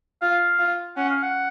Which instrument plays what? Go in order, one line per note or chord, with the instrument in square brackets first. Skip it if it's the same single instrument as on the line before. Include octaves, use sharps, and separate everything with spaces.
[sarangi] F4 [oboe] F5
[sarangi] F4
[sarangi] C#4 [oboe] F#5
[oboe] F5
F#5